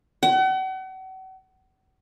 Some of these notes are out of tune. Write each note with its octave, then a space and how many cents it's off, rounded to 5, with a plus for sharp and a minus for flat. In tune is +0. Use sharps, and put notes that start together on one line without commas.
F#5 +40